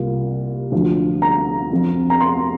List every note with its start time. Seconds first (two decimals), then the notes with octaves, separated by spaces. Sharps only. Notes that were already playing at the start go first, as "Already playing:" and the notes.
Already playing: C2 C3 A#3 F4
0.72 D2 D3 F3 D4 F4
1.22 A#5
1.71 F2 F3 C4
2.10 A#5
2.21 C6